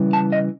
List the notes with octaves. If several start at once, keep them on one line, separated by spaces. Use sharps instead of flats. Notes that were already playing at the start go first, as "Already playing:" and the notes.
Already playing: C#3 E3 G3
A5
D#5